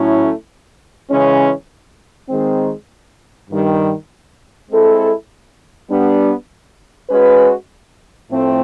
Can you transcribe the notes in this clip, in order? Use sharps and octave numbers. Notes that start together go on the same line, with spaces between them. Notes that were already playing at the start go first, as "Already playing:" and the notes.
Already playing: A2 F#3 A3 C#4 E4
C#3 E3 G#3 C#4
D#3 G#3 C4
G2 D#3 G3
G#3 C4 E4 A4
G3 B3 D4
G#3 C#4 F#4 B4
A2 F3 A3 C4